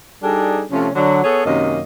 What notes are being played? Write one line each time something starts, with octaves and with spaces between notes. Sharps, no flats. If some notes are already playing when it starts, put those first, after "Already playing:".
G3 D4 D#4 G#4 A4
C3 F3 A3 C#4
D3 F#3 D4
B3 G#4 A4 C#5
F#2 C3 D#3 A#3 C#4 D#5